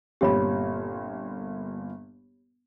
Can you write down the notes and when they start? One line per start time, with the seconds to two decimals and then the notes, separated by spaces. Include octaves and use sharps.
0.21 G1 A#2 C4 G4 C#5 B5